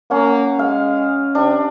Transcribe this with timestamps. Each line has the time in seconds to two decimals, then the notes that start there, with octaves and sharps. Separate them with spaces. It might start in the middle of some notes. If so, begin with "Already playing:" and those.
0.11 A#3 C#4 F#5
0.59 G#3 F5
1.35 C3 D4